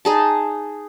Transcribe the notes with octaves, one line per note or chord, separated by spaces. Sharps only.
D#4 G#4 A5